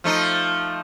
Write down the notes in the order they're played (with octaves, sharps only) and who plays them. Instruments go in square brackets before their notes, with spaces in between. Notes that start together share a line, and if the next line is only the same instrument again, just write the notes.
[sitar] F3 A3 D#4